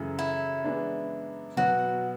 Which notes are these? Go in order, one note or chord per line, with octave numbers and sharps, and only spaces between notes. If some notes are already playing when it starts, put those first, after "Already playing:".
Already playing: F#2 C#3 E3 A3
E4
E3 G#3 B3 D4
B2 F#3 B3 F#4